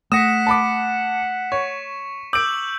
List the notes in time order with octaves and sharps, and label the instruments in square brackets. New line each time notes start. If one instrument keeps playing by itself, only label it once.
[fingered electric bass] A3 [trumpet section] F#5 [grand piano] D#6 A#6 [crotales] B6 C#7 E7
[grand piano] A5 B5 D6
[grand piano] C#5 [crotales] C#6
[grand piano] D6 D7 [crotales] E6 G6 F#7